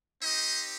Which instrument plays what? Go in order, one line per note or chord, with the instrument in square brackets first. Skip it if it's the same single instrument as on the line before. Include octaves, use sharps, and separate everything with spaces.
[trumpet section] C4 D#4 G4 C5 D#5